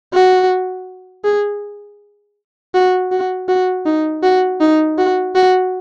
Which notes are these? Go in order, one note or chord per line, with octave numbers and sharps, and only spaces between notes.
F#4
G#4
F#4
F#4
F#4
D#4
F#4
D#4
F#4
F#4